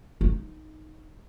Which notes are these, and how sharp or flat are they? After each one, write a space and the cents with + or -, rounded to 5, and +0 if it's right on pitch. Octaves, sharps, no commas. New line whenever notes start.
D#4 -5